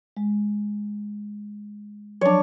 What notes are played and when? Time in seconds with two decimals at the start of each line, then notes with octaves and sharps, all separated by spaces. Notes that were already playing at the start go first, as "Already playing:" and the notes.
0.17 G#3
2.21 F3 F#3 D4 C#5